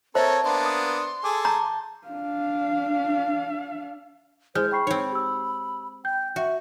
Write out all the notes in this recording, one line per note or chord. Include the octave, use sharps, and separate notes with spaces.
C4 A4 A#4 C5 C#5 E5 A5
A#3 B3 D4 C6
D#6
G#4 A4 D6
A5 A#5 G6
D4 F5
G#3 E4 C5 F6 G6
G5 B5 C#6 C7
C4 D#4 C#5
G4 E6
G5 G6
F#4 E5